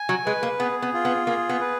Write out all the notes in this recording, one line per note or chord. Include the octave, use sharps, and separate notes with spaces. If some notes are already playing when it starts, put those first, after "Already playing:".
Already playing: G#5
F#3
G#3 B4
A#3
B3 G#4
B3
F4
B3
A#3 G#4
B3
B4